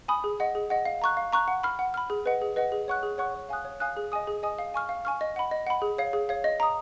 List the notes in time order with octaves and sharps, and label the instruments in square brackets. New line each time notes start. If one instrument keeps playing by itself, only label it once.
[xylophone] G#5 B5 D#6
G#4
D#5 F#5
G#4
D#5 F#5
F5
A#5 C#6 F#6
F5
A#5 C#6 F#6
F#5
B5 F6
F#5
B5 F6
G#4
B4 D#5 F#5
G#4
B4 D#5 F#5
G#4
C#5 F#5 C#6 F#6
G#4
C#5 F#5 C#6 F#6
C#5
F5 G#5 D#6 F#6
C#5
F5 G#5 D#6 F#6
G#4
D#5 G#5 D#6
G#4
D#5 G#5 D#6
F5
G#5 C#6 F6
F5
G#5 C#6 F6
D#5
F#5 B5
D#5
F#5 B5
G#4
C#5 F5
G#4
C#5 F5
D#5
A#5 D#6